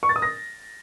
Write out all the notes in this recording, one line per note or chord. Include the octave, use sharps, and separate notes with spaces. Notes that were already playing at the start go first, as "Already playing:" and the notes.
C#6
A6
D#6
A#6